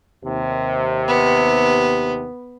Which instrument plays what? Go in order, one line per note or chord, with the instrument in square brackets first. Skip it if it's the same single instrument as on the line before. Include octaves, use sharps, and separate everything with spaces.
[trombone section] D#2 C3
[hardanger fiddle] B3